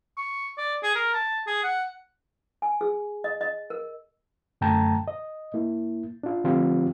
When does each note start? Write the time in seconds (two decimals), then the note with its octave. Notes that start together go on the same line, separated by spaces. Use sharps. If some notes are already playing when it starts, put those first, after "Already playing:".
0.17 C#6
0.58 D5
0.83 G#4
0.95 A#4
1.14 A5
1.47 G#4
1.63 F#5
2.62 G#5
2.81 G#4
3.24 D#5
3.41 D#5
3.70 A#4
4.61 F#2 D3 A3 G5 A5 A#5
5.08 D#5
5.54 A#3 E4
6.23 D4 F4
6.44 D3 F3 C4 F4 G4